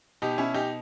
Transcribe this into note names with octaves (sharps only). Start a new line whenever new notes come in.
B2 D#4 G4
C#4 E4
D#4 G4